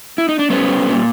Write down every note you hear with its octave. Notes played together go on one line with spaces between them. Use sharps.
E4
D#4
D4
G3 B3 C#4
G3
A#2